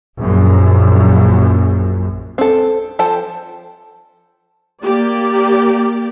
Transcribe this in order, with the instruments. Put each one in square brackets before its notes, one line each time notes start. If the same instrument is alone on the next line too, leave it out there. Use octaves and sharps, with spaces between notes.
[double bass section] A#1 F#2
[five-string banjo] C4 A4
F3 A4 C5 G5
[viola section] A#3 G4 D5